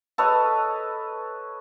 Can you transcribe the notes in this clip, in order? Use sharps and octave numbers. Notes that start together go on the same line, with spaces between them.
A4 B4 C#5 D#5